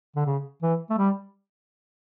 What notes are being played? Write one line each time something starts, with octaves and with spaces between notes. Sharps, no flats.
D3
C#3
E3
A3
G3